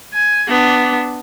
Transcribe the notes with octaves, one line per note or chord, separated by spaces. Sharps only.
G#5
B3 D4